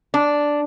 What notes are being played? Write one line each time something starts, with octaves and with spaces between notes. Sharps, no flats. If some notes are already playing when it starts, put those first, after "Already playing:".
D4